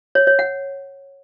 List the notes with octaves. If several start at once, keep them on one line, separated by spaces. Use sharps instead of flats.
C#5
C#5
F#5